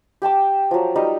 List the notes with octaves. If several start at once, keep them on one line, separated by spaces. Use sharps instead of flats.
G4 G5 A5 D6
F3 F#3
G3 D#4 A#4 D#5